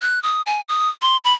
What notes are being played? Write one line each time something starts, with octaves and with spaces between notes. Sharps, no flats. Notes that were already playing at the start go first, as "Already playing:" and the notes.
F#6
D#6
G#5
D#6
C6
B5